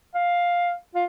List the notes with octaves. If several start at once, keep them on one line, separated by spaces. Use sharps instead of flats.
F5
F4